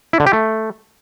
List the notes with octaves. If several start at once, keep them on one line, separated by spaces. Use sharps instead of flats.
E4
D3
G4
A3